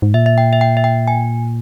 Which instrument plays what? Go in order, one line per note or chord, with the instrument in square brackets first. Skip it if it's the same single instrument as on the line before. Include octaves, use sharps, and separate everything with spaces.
[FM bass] G#2
[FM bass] A#2 [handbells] E5
[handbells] E5
G5
E5
G5
E5
G5
G#5